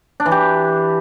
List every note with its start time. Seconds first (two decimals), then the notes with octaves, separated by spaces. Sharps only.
0.20 D4
0.26 E3
0.32 G4